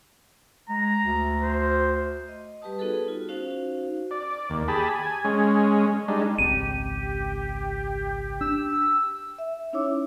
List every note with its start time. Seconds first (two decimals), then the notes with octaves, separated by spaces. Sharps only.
0.69 G#3 A#5
1.05 D2
1.43 C5
2.28 D#5
2.62 G3 G4 B4 G5 A5 D#6
2.78 B3 D#4 F#4 G#4 A4 B4
3.08 F4
3.29 C#4 D#4 F#4 C5 F5
4.11 D5
4.50 D#2
4.68 G4 G#4 A5 B5
4.96 G#5
5.25 G#3 C#4
6.08 G3 G#3 D4 D#4
6.38 G#1 C#2 C4 G4 D#7
8.41 D4 E6
9.38 E5
9.73 C#4 D#4 E4 C#5 D6 E6